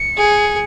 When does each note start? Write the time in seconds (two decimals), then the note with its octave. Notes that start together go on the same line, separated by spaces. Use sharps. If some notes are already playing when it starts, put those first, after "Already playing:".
Already playing: C#7
0.17 G#4